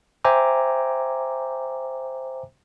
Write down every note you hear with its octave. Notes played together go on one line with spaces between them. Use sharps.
C5 E5 G5 G#5 A#5 D6